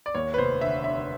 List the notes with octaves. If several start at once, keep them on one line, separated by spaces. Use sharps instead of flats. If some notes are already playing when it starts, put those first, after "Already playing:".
D5
D#2 C#5
B4
F1 C5
D3 E5
D3 E5